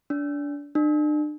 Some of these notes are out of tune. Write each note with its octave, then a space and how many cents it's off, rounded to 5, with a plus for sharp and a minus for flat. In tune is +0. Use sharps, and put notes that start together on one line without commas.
D4 -25
D4 +40